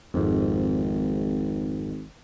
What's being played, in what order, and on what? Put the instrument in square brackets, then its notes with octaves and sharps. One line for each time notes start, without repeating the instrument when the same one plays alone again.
[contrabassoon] G#1 [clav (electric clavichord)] F2 G#2